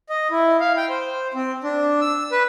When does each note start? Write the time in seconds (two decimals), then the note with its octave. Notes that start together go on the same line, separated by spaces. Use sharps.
0.09 D#5
0.31 E4
0.60 F5
0.77 G5
0.89 C5
1.34 C4
1.64 D4
2.01 E6
2.32 B4